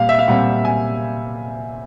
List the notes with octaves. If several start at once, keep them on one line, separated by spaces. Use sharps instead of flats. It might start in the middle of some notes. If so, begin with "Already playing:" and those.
Already playing: A#2 G3 F5
E5
F5
A#2 G3 C4 F#5
G#5